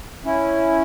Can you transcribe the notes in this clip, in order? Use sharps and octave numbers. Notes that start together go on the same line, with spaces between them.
C#4 E4